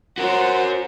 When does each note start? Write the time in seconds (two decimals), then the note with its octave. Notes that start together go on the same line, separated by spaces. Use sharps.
0.18 F#4 A#4 C5 C#5 F#5